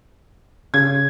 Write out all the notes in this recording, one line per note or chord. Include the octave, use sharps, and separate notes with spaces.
C#3 G#6